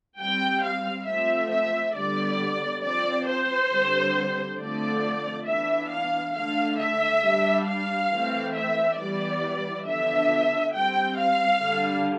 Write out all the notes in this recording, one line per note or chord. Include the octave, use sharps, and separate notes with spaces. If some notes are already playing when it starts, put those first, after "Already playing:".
G3 C4 G5
F5
F3 A3 C4 E5
E5
D3 G3 B3 D5
F3 C4 D5
C5
D3 G3 C4
D3 F3 A3 C4 D5
E3 B3 D4 E5
F5
D3 A3 D4 F5
E5
G3 D4
F5
E3 A3 C4
E5
E3 G3 B3 D5
D3 F3 B3 D4 E5
G3 C4 G5
F5
D3 G3 D4